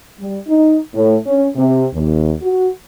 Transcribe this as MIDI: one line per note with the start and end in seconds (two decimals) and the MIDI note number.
0.19 0.39 55
0.48 0.78 63
0.95 1.16 45
1.26 1.48 61
1.56 1.85 48
1.94 2.33 39
2.42 2.69 66